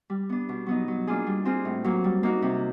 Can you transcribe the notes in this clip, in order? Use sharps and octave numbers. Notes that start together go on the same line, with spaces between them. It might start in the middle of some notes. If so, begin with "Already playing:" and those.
G3
B3 D4
B2
F#3 B3 D#4
F#3
A#3 D4 F4 G#4
G3
C4 F4 G#4
A2
F#3 A#3
G3
A#3 D#4 F#4
C3